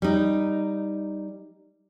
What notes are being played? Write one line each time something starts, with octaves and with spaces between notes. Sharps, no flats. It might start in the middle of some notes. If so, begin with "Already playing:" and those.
G3 D#4